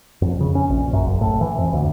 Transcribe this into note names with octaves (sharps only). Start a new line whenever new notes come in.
F2
C#3
C#4
A#1
F#2
F#1
A2
E3
F2
D2